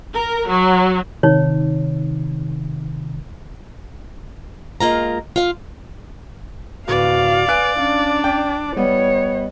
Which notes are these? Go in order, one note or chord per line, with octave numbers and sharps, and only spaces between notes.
A#4
F#3
C3 D#3 D#4 C#5
G#3 A#3 F4 A#5
F4 F5
D1 F#4 B4 D5 F5
B4 G#5 F#6 D7
C#4 D4 F5
G5
G3 B3 C#5 D#5